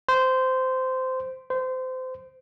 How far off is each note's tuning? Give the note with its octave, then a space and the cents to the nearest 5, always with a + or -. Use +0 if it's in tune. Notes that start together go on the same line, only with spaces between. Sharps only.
C5 -15
C5 -25